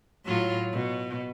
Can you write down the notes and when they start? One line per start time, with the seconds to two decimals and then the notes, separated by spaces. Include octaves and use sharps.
0.25 A2 F#3 F4
0.72 B2